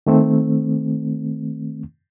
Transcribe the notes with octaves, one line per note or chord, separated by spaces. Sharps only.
D#3 A3 C4